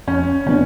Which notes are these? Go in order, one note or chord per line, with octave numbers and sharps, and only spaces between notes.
F2 C#4
C#3 F#3 B3 C#4 D4